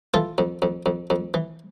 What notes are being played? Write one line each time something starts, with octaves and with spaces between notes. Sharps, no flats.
E3 F4 A4
F2
F2
F2
F2
E3